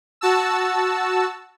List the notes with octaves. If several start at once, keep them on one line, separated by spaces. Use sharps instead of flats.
F#4 A5 E6